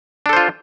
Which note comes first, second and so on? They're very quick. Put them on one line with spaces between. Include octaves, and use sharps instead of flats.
D4 A4 C5 F4